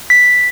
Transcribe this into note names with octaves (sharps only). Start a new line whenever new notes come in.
B6